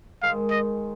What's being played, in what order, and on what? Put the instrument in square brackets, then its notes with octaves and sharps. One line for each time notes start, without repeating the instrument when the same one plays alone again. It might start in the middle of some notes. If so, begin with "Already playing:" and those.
[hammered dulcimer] G#2 D#3 G#3 [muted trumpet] F5
[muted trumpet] D#5